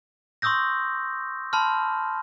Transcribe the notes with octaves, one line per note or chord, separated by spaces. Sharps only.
C6 C#6 D#6 E6 G6 A#6
A5 B5 C6 F6